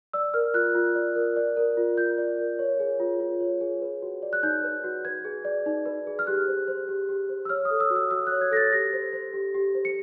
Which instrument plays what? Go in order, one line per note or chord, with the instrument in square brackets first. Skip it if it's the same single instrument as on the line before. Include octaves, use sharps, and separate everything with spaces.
[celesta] D5 E6
A#4 F6
F4 F#6
F4
D5
A#4
D5
A#4
F4
F4 G6
D5
A#4
C#5
G#4
F4
F4
C#5
G#4
B4
F#4
D5
F#6
D#4 G6
B4
F#4
B4 G#6
G#4
D5
D#4
B4
G#4
F6
G4 F#6
C5
C5
G4
G4
C5
E6
C#5 F6
D#6
A4
E6
F#4
E6
F#4 E6
F#6
C#5
G#6
A4 A#6
A6
G4 A#6
C5
C5
G4
G4
C5
C#7